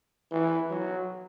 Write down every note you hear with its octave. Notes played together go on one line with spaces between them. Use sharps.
E3
F#3